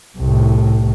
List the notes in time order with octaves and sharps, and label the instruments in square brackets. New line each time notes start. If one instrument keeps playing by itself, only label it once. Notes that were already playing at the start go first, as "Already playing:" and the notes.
[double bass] C2 A2